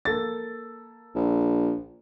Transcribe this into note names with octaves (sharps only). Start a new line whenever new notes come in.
A#3 A4 A6
A#1